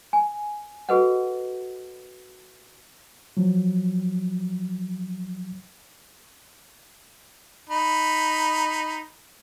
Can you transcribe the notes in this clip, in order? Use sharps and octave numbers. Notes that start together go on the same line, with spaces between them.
G#5
F#4 G#4 A4 B4 D#5 F#5
F3 F#3
D#4 B5